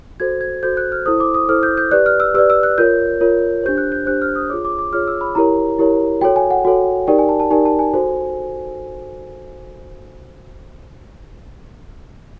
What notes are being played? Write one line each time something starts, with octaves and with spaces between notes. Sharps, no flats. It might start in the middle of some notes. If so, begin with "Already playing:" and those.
F#4 A4 C5 G#6
G#6
F#4 A4 C5 G6
F#6
F6
E4 A4 C5 D#6
D6
D#6
E4 A4 C5 F6
G6
G6
G4 B4 D5 F#6
F6
E6
G4 B4 D5 E6
E6
F#6
F4 A#4 C#5 G6
F4 A#4 C#5
D4 G4 C5 G6
F#6
G6
D4 G4 C5 F#6
F6
D#6
F4 G#4 C#5 D6
D6
D6
F4 G#4 C#5 F6
E6
B5
E4 G4 A#4 C#5 A#5
E4 G4 A#4 C#5
F#4 A4 C#5 G5
G#5
F#5
F#4 A4 C#5
D#4 G4 A#4 D5 G5
G#5
A5
A5
D#4 G4 A#4 D5 G#5
A5
G#5
F#4 A4 C5